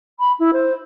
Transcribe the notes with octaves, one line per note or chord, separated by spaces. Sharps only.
B5
E4
C5